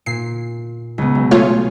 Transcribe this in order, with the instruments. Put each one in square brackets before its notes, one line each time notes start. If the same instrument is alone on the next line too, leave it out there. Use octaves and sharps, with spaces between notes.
[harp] A#2 [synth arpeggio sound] C7
[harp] C#2 B3
B1
[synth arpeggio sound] A3 F4 C#5 [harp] G#4